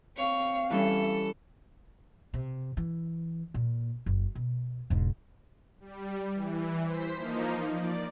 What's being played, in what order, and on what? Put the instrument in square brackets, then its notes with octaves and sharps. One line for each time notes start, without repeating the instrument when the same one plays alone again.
[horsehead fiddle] C4 F5 [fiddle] C#5
[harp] E3 G3 C#4 [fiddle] A4
[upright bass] C3
E3
A#2
F#1
B2
E1 G#2
[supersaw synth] G3
E3
C5 B6
F3 A#3 D#4
D5